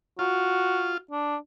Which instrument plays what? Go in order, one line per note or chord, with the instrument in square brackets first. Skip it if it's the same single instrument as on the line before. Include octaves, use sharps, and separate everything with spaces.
[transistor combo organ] F4 [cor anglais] F#4
[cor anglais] D4